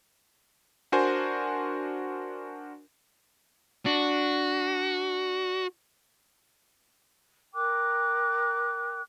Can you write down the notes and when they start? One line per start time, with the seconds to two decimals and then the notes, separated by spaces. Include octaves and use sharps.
0.92 D4 F#4 A#4 C5 G#5
3.86 D4 F#4
7.54 A#4 G5 D6 F#6